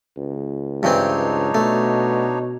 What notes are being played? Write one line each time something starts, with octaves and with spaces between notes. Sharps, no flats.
C#2
G2 E3 C4 D4 D#4 C#5
B2 A3